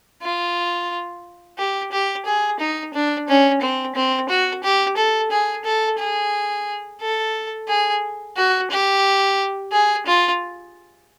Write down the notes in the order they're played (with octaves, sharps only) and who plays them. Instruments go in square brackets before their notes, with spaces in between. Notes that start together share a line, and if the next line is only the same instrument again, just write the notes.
[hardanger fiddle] F4
G4
G4
G#4
D#4
D4
C#4
C4
C4
F#4
G4
A4
G#4
A4
G#4
A4
G#4
F#4
G4
G#4
F4